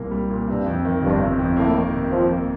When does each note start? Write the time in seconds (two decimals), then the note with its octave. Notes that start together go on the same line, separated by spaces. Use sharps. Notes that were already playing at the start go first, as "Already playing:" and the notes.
Already playing: C2 A#2 G3 A#3
0.11 G3
0.30 A#2
0.48 G2 C3
0.66 F2
0.85 D#3
1.03 G1 G2
1.20 C3
1.39 F2
1.57 A2 A#3
1.75 D#3
1.93 C3
2.11 C3 F3
2.29 A#3